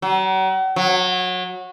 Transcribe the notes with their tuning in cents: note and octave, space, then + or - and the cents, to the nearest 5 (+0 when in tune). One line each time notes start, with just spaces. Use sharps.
F#3 +40
F#3 -20